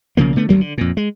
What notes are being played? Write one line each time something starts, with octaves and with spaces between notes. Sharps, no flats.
B1 C#3 F3 A#3
D3 A3 B3
G#1 D2 F#3 A#3
D3
F2 A#2
G#3